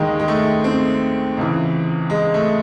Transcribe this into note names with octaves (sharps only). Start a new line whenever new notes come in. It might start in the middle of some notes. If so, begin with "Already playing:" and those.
Already playing: D#2 D#3 G#3
G#3
A3
C4
C#2 C#3 E3
G#3
A3